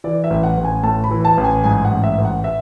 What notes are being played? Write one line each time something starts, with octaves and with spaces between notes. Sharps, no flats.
E3 D5
E5
A1
F#5
A1
G#5
A2 A5
B5
E3
A5
A1
G#5
G#2 G#5
F#5
A1
E5
A1
F#5
E5